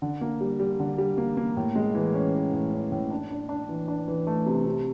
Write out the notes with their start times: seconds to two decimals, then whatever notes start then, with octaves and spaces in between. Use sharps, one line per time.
0.02 D3
0.21 A#3
0.41 G3
0.60 G3
0.80 D3
0.98 G3
1.18 A#3
1.37 A#3
1.57 A2
1.76 G#3
1.95 E3
2.14 C#4
2.34 E3
2.53 A2
2.73 C#4
2.92 A2
3.11 D4
3.31 D4
3.49 D4
3.69 E3
3.88 D4
4.08 E3
4.27 A3
4.46 C3
4.65 C3